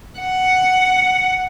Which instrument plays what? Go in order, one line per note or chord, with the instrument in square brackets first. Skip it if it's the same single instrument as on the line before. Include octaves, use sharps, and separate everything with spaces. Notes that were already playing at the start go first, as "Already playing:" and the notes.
[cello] F#5